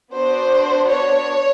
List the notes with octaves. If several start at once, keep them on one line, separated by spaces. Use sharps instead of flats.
B3 D4 F#4 C5
C#5